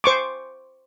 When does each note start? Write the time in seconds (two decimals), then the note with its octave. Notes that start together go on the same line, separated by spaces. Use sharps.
0.04 C5 C#6 D6